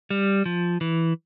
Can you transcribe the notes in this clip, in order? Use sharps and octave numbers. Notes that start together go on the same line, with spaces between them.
G3
F3
E3